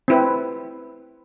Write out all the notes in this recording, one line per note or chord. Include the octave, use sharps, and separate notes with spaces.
C4 E4 B4